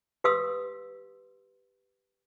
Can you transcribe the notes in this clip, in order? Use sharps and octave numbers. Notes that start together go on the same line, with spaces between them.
G4 B4 F5 C6 D#6 E6